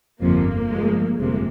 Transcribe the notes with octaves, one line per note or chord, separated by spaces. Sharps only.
G1 F2 C3 F3 A#3
G2 F3 G#3
G1 F2 C3 G#3 A#3